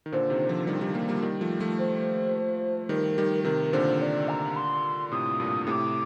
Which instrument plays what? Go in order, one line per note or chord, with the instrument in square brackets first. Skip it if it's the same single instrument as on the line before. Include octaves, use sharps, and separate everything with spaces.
[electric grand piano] D#3
[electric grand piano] A#2 D3 [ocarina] C5
[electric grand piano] C3 D#3
D3 F3
D#3 G3
D#3 G3
G3 A#3
G3 A#3
D#3 G3
F3 A3
F3 A3
[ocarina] C5
[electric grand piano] D#3 G3 [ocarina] A#4
[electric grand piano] D#3 G3
[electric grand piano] C3 D#3 [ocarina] A#4
[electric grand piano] A#2 D3 [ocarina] C5
[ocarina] D5
A#5
C6
[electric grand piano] A2 C3 [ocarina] D#6
[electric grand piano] G2 A#2
[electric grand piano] A2 C3 [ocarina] D6 D#6